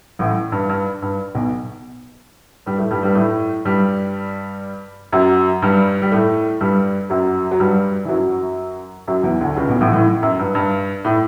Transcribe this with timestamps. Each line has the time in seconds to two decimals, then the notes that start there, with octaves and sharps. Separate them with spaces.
0.19 A1 A2
0.52 G2
0.69 G2
1.02 G2
1.35 B1 B2
2.66 G2 G3
2.78 A2 A3
2.91 G2 G3
3.03 G2 G3
3.15 A2 A3
3.65 G2 G3
5.13 F#2 F#3
5.62 G2 G3
6.02 G3
6.12 A2 A3
6.61 G2 G3
7.10 F#2 F#3
7.51 F#3
7.60 G2 G3
8.05 E3
8.09 F#2 F#3
9.08 F#2 F#3
9.23 E2 E3
9.41 D2 D3
9.57 C#2 C#3
9.68 B1 B2
9.81 A1 A2
9.93 A1 A2
10.23 F#2
10.39 G2
10.55 G2
11.05 A2